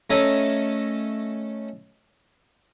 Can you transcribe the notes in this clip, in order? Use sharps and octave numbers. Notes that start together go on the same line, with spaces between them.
A3 C#4 A4 A#4 D#5 G#5